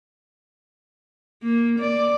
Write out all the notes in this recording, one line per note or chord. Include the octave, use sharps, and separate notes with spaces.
A#3
D5